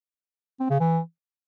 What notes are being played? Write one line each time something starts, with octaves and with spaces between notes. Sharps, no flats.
C4
C#3
E3